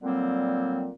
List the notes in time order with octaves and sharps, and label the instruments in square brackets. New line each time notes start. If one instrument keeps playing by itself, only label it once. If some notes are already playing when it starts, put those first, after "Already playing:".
[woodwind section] A#2 D3 F#3 G3 A#3 C4